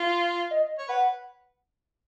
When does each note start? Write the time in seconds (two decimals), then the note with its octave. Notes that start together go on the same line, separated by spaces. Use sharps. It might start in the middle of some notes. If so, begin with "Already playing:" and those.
Already playing: F4
0.51 D#5
0.78 C#5
0.88 B4 F#5